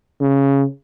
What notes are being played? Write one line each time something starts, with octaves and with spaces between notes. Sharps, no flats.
C#3